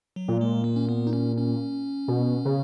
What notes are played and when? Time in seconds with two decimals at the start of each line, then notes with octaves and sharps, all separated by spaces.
0.16 F#3
0.28 A#2
0.41 G#3
0.64 A#3
0.76 C#4
0.89 B3
1.07 D#4
1.13 C#4
1.37 C#4
2.08 B2
2.45 C#3